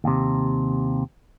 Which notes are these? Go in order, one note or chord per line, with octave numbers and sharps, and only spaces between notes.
D#2 C3